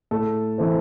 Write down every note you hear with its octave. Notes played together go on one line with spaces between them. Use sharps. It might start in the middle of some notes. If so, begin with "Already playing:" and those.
A2 A4
E3 A3 C4